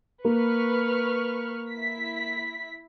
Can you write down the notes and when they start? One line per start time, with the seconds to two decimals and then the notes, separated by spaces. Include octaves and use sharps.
0.25 A#3 B4 C#6 F6
1.73 E4 B6